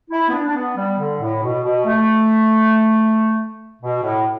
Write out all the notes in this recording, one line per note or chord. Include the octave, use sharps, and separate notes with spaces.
E4
B3
D4
D4
B3
G3
D3
A2
B2
B2
A3
B2
A2